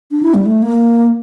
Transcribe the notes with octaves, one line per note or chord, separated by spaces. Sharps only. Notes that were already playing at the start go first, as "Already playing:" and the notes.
D4
E4
G3
A3
A#3